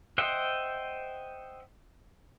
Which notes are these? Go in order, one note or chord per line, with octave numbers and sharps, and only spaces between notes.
C5 D#5 E5 F#5 G5